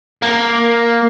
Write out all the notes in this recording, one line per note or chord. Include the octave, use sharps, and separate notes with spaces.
A#3